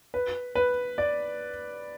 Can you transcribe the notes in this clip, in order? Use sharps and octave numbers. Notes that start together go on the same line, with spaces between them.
B4
B4
D5